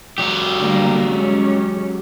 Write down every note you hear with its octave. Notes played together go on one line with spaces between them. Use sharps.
F#3 G4
D3 G3 A#3
G#3 C#4